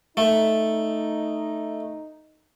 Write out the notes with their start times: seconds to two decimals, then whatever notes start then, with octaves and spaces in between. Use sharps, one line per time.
0.17 A3 D#4